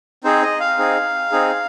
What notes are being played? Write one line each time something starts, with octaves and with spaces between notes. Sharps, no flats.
C4 D#4 G#4 C5
D#5
F5
C4 D#4 G#4
C4 D#4 G#4